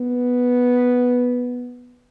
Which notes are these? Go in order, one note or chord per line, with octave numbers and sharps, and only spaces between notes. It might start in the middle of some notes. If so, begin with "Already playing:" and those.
Already playing: B3